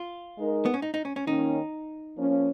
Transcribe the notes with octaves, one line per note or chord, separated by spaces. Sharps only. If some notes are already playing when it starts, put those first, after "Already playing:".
Already playing: F4
G#3 D#4 A#4
B3
C#4
D#4
D#4
C#4
C#4
D#3 A#3 C#4 D#4
F3 A#3 C#4